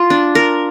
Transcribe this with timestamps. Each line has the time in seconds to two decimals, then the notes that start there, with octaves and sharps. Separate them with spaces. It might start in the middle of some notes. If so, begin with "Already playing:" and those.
Already playing: F4
0.10 D4
0.35 A#4